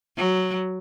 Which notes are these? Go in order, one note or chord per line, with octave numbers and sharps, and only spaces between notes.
F#3